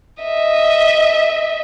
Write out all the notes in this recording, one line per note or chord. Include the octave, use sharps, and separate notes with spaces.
D#5 E5